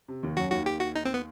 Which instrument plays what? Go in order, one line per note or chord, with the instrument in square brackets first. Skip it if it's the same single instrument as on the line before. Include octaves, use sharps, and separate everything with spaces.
[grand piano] C3
D#2 D#3
[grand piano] F#2 F#3 [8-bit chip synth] F#4
[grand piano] D#2 D#3 [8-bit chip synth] F#4
[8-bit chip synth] G4
F#4
D#4
C4
B3